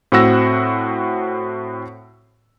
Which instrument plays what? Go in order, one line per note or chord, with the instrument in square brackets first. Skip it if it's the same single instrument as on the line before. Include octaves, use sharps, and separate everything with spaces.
[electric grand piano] A2 C4 F#4 F#5 E6 A#6